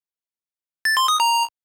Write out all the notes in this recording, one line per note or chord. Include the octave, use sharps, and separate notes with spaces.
A6
C6
D#6
A#5